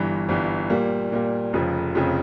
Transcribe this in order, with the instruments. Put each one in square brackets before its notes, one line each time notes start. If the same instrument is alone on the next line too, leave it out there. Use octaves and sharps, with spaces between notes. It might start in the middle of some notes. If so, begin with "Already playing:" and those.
Already playing: [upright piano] G1 G2 E3
G1 G2 E3
A#2 G3 A#3
A#2 G3 A#3
F1 F2 C#3 F3
F1 F2 C#3 F3